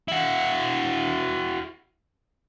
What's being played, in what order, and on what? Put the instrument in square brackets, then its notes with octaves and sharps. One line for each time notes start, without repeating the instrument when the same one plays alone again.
[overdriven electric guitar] E4 F#4